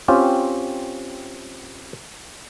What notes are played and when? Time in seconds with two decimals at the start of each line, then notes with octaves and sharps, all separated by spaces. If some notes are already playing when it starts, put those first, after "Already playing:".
0.08 C4 C#4 F4 G4